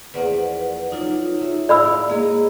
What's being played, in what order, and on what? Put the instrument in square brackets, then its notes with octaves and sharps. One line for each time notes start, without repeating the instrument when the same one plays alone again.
[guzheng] E2 F3 A#3 [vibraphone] B4 D5 F#5
[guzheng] F#3 D5 F5 [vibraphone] D#4 F4
[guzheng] F#3 A3
[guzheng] A2 A#4 [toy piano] D5 B5 E6 [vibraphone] F5
[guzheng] G#3 C#5 F5 [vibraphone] A#3 G#4 D#5